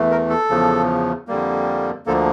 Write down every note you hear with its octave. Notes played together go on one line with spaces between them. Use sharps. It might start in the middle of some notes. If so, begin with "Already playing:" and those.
Already playing: E2 E3 A3
A#4
A4
E2 C#3 F3
F2 D3 G3 A#3
D2 D3 F3 A#3 A4